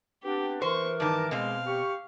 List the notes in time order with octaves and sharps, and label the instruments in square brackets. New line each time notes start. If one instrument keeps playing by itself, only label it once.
[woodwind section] B3 C4 D4 [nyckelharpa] G4
[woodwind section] E3 A#4 [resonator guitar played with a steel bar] C5 [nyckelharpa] C#6
[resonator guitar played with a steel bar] G2 D#3 [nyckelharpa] A5 D6
[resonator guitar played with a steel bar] B2 C4 [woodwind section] G#3 [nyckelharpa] F5
[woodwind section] G4 C#6